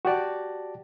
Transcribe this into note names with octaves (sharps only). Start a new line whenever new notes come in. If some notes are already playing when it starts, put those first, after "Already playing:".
F#4 G4 D5 A5